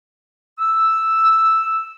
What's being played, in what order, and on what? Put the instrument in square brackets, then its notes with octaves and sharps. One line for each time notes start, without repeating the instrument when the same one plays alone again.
[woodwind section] E6